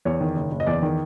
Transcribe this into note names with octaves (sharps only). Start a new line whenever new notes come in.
E2 C#5
D#3
F#1
F#1
D#5
E2 D5
D#3